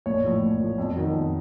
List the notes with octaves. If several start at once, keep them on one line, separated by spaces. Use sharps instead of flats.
A#1 C#5
A2 F3
A#1
A2 F3
F2
D#3 F#3
F2